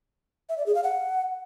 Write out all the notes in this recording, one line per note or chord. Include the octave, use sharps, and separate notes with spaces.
E5
D5
G#4
F5
F#5